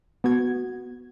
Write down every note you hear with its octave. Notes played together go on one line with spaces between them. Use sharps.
B3 F#4 G#6